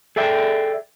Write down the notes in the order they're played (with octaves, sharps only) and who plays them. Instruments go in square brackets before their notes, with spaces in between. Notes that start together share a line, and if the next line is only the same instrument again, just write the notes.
[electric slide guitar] G#4 A4 D5 E5 G5